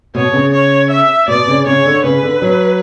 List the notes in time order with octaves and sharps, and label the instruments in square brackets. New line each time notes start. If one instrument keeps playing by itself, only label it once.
[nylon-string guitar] B2 [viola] C#5
[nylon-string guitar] C#3
[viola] C#5
E5
[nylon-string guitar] B2 [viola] D5
[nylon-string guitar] C#3
[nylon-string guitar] C#3 [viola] C#5
[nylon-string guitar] D3
[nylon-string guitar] C#3 [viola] B4
[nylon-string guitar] D3
F#3